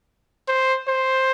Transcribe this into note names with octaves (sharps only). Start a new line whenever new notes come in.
C5
C5